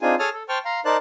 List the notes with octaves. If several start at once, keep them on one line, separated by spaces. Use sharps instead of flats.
C4 D4 D#4 F4 G#4 G#5
G#4 A4 C#5 A5 D#6 F6
A4
C5 G5 A5 C#6 F6
F5 A#5 C6
D#4 A#4 C5 D5 A5 F#6